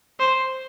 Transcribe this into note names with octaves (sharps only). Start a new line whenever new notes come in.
C5